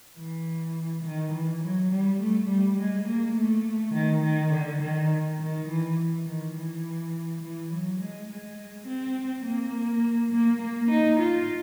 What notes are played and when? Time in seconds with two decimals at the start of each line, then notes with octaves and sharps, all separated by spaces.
0.17 E3
1.04 D#3
1.33 E3
1.62 F#3
1.91 G3
2.20 A3
2.49 G3
2.78 G#3
3.07 A#3
3.36 A3
3.94 D#3
4.23 D#3
4.53 D3
4.81 D#3
5.39 D#3
5.68 E3
6.26 D#3
6.55 E3
7.42 E3
7.72 F#3
8.00 G#3
8.29 G#3
8.87 C4
9.45 A#3
10.33 A#3
10.62 A#3
10.91 D#4
11.20 F4